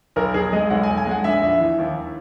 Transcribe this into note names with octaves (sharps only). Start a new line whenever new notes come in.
B1 A#4
B1 G#4
G#3 D#5
B1 F#5
G#5
B1
G#5
G#3 F#5
A#1 E5
A#1
E3
D#2